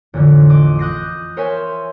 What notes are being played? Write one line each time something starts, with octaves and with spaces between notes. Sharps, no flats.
A1 F2 D3
D#5 D6
D#6 F#6 G6 A#6 C7
A#4 C5 C#5 E5 F5 G#5